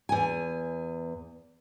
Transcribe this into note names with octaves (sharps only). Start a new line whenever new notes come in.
E2 G#5